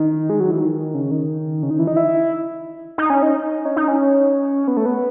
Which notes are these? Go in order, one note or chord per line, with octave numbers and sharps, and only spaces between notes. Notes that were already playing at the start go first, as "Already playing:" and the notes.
Already playing: D#3
G#3
F#3
E3
D#3
C#3
D#3
C#3
D#3
E3
D#4
E4
D#4
C#4
D#4
C#4
D#4
C#4
B3
A3
B3